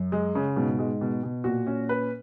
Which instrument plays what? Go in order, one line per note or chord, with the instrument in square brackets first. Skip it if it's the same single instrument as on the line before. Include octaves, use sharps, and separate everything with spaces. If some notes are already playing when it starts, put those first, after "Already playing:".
Already playing: [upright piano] F#2
[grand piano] G#3
C#3
[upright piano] G#2 [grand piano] B2
[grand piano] G#3
B2
B2
[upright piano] A#2 [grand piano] F#4
[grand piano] C#4
B4